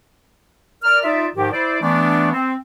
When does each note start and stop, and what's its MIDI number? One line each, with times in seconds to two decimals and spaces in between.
0.83 1.01 70
0.83 1.01 74
0.83 1.01 89
1.04 1.26 63
1.04 1.26 65
1.04 1.26 74
1.04 1.26 76
1.35 1.52 44
1.35 1.52 51
1.35 1.52 53
1.35 1.52 67
1.52 1.78 64
1.52 1.78 72
1.52 1.78 74
1.81 2.30 52
1.81 2.30 57
1.81 2.30 59
1.81 2.30 62
2.33 2.54 60